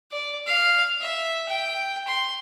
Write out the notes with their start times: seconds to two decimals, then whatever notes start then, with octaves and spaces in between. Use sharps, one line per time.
0.12 D5
0.47 F5
1.01 E5
1.48 G5
2.07 C6